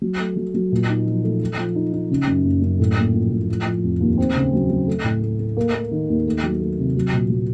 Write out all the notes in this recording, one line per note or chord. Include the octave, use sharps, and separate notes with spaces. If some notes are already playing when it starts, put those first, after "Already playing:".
F#3
A3
F#3
F#3
A#2
D#4
F3
A3
A3
F3
D#4
D#4
C#3
F#2
F#1
F#2
A2
A#1
F3
A2
F3
F3
F1
D#2
C4
C#3
F#3
F#3
A3
A2
A3
A3
A#3
A#3
D#3
D#2
A3
F#3
A3
C3
F#3
A#2
F#3